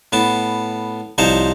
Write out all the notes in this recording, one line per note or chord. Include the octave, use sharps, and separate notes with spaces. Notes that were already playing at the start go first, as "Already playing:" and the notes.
A2 B3 A5
C2 F3 D#4 C5 C#5 A5